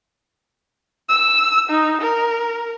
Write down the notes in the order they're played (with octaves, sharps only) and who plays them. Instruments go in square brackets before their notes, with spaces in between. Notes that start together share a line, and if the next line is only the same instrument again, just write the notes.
[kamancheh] E6
D#4
A#4